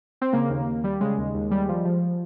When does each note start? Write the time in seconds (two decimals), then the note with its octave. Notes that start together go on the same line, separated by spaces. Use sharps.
0.22 C4
0.33 C#3 A#3
0.50 D#2
0.67 D#2
0.84 G3
1.01 C#3 G#3
1.18 D#2
1.35 D#2
1.51 G3
1.69 F3
1.85 F3